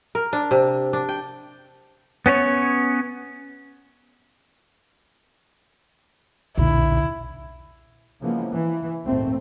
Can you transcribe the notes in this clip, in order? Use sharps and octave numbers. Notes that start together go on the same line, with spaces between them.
A#4
D4
C3
D4
G5
B3 C#4 G4 C#5
B1 E2 A#2 D3 E4
C#3 E3 F3 G#3 A#3 B3
E3
A#1 D#2 G#2 A3 C4